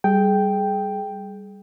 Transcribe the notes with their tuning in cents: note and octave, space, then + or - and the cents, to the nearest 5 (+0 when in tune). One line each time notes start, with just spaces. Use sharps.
G3 +0 G#4 +30 G5 +0